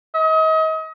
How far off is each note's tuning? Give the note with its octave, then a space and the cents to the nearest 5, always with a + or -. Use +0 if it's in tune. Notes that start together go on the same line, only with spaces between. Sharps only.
D#5 +35